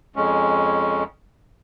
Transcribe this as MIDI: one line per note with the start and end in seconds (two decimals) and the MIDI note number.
0.16 1.04 41
0.16 1.04 56
0.16 1.04 61